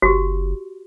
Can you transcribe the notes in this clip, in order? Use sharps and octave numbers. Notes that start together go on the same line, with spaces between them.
F#1 F#4 G4